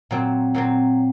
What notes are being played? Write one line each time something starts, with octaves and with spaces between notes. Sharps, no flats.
A#2 F#3 C4
A#2 F#3 C4